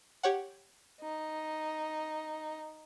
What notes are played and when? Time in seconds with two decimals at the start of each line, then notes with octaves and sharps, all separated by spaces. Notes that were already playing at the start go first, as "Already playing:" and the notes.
0.23 G4 C#5 F#5
1.01 D#4